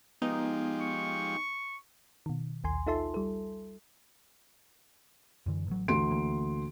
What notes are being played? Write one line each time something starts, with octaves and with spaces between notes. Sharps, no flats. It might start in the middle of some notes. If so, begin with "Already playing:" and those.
F3 G#3 B3 D#4 G4
C#6
B2 D#3
A#1 D#2 G#5 C6
D#4 F4 A4 E5 A5 C6
G3 A4
F#2 D3 E3
A1 F#3
D2 E3 C6 D7
D3 E3 A#3